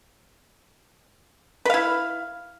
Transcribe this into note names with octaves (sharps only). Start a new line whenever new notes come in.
E4 B4 F5